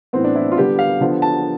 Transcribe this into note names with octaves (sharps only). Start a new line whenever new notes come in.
A2 E3 B3 C4
D4
E4
F4
D3 G3 B3 G4
F5
D3 F3 B3
A5